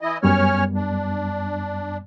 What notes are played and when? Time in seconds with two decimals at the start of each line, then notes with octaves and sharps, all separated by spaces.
0.01 E3 E4 D#5
0.23 F#2 G3 B3 C#4 C#5 F6
0.75 D4